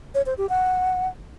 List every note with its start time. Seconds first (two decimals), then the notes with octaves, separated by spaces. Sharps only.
0.15 C#5
0.26 C5
0.38 G4
0.49 F#5